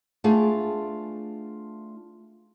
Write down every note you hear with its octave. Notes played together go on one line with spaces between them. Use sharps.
A3 B3 D4 F4 G#4